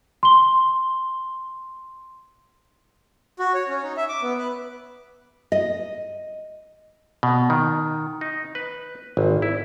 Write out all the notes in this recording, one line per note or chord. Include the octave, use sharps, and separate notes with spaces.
C6 G7
F#4
C#5
C#4
D#4
E5
D6
B3
B4
D#5
B2
D#3
D#4
B4
G#1
E4